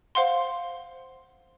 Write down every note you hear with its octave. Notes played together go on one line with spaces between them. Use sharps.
C5 F5 F#5 C6